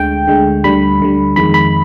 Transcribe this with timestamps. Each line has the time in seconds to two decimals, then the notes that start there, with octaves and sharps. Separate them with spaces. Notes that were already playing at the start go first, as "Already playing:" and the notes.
Already playing: D2 D3 G#3 G5
0.28 D2 D3 G#3
0.64 D2 D3 G3 B5
1.00 D2 D3 G3
1.36 F2 D#3 G#3 B5
1.54 B5